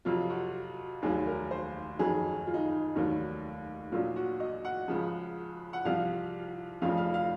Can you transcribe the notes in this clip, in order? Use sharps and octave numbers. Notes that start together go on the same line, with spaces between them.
F2 C3 F#3 F4
F#4
F1 D#2 D#3 F#3 G#4
A#4
C5
F#1 F2 D#3 F#3 G#4
F4
D#4
D#4
F1 D#2 D#3 F#3
A#1 A#2 F#3 F4
F#4
D#5
F#5
C#2 C#3 F3
F#5
C2 C3 F3 F5
F1 F2 C#3 F3 F5
F5
F5